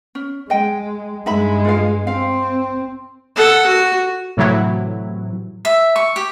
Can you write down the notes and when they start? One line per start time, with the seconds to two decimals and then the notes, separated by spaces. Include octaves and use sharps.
0.15 C#4
0.50 G#3 D#5 G5
1.26 G2 G#3 D#4 E5 B5
1.65 F4 B4 F5
2.07 C4 F5
3.36 A4 F#5
3.67 F#4
4.37 A2 C3 E3 F#3 E4
5.65 E5
5.96 C#6
6.16 G4